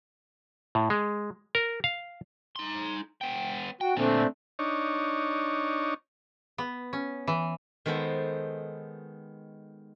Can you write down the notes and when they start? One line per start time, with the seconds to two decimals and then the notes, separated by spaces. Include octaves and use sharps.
0.75 A2
0.90 G#3
1.55 A#4
1.84 F5
2.56 D#4 C6
3.21 B3 G5
3.81 F#4 G5
3.97 A#2 D3 A3 C4 D4
4.59 D4 D#4 C#5
6.58 B3
6.93 C#4
7.27 E3
7.86 D#3 G#3 B3 A4 C5